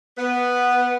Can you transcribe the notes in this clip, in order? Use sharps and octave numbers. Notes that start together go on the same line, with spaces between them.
B3